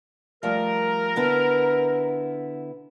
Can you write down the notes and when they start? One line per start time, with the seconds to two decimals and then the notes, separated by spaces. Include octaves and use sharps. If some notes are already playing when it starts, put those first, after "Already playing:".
0.43 F3 G3 A3 A#4
1.16 D3 B3 E4